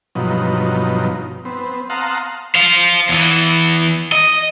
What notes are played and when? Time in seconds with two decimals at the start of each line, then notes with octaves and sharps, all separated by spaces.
0.15 G2 B2 F3 F#3 D#4
1.45 B3 C4
1.90 F5 F#5 A5 A#5 C6 D#6
2.55 C5 F5
3.09 E2 E3
4.12 D#5